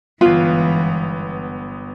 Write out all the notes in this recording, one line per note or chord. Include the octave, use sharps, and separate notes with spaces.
G1 G#2 E3 B3 F4 B4 F5